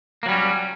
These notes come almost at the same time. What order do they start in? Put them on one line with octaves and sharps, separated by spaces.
A#3 F#3 G3 C#4